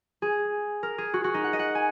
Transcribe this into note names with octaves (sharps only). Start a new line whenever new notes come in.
G#4
A#4
G#4
F#4
F#4
D#4
F#5
D#5
F#5
G#5